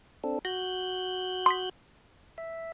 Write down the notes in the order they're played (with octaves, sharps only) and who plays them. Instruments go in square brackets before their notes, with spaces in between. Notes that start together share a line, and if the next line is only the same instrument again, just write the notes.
[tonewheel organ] C4 D4 A4
[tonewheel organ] F#4 F#6 G6 [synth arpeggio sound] A#6
[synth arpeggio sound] C6 D#6 B6
[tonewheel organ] E5